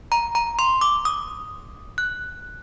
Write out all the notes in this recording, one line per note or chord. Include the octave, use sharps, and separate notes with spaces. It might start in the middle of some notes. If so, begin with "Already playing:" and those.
A#5
A#5
C6
D6
D#6
F#6